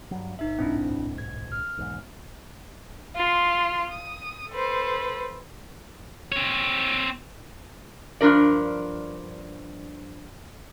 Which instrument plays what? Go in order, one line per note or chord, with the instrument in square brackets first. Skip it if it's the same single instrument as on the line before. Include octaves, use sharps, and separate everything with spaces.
[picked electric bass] G2 F#3
[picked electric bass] G1 [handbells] D#4 E5
[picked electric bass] D1 B1 G#2 [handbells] C4 D4 E4
[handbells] G#6
F6
[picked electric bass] B1 E2 G#2
[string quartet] F4 C6
D#6
A4 B4 C5
[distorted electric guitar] C4 C#5
[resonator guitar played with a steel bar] G2 F3 D4 A#4 D5